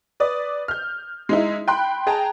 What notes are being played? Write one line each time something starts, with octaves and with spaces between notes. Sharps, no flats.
B4 D5 D#6
F6 G6
G#3 D#4 E4
G5 B5 C6 F#6
G#4 G5 A5 A#5